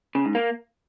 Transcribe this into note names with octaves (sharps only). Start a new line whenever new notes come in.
C#3
G#2
A#3